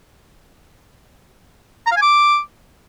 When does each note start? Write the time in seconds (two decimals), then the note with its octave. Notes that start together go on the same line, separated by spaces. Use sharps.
1.86 A#5
1.92 F5
1.97 G#5
2.02 D6